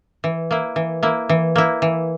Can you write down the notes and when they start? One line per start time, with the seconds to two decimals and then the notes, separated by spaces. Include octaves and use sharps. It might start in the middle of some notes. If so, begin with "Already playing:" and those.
0.24 E3
0.51 A#3 E4
0.76 E3
1.03 A#3 E4
1.29 E3
1.56 A#3 E4
1.82 E3